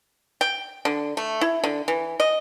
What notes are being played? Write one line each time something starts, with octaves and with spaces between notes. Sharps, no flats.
G5
D3
A3
E4
D3
E3
D#5